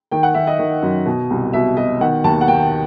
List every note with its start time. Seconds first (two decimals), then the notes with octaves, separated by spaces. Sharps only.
0.11 D#3 G5
0.23 F#5
0.34 D#3 E5
0.47 D#5
0.59 D#3
0.82 F#2
1.06 B2
1.30 C2
1.53 B2 E5
1.77 B2 D#5
2.01 D#3 F#5
2.24 D#2 A5
2.41 F#5
2.48 D#3 G5